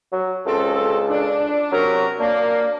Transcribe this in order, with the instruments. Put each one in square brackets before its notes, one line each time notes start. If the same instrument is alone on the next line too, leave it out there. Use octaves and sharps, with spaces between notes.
[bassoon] F#3
[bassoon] C#2 [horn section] C#3 C4 A4
[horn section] D4
[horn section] C3 C#4 A#4 [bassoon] F#3
[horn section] A#3 [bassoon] D4